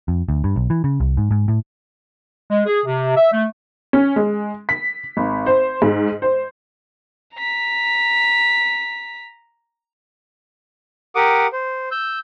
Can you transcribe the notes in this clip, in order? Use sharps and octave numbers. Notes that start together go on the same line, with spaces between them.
F2
D2
G2
B1
E3
C#3
C2
G#2
G#2
A2
G#3
G#4
C3
E5
A3
C#4
G#3
B6
G#1
C5
G#2
C5
A#5 B6
G4 A#4 F#5 D6 D#6
C5
E6 G6